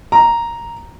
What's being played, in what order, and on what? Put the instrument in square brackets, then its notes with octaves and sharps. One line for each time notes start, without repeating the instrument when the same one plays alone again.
[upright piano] A#5